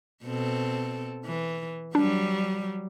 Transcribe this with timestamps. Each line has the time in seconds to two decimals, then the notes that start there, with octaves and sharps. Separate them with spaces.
0.24 B2 C4 A4
1.26 E3
1.95 F#3 G3 D4